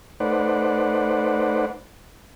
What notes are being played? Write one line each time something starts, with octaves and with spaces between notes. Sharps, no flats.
A3 D#4 B4 C5 D5 F#5